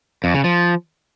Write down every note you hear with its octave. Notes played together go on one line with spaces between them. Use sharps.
F2
C#3
F3